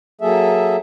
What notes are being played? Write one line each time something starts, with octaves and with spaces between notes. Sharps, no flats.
F#3 A#3 G#4 A4 E5